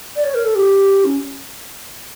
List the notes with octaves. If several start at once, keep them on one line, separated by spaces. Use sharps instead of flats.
D5
C#5
A#4
A4
G4
C#4